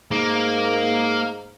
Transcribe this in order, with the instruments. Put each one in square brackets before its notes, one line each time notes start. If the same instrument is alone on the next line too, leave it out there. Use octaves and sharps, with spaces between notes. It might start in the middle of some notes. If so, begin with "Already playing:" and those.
[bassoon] G#2 [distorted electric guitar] A#3